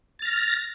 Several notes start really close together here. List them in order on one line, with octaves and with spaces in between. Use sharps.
A6 F6 A#6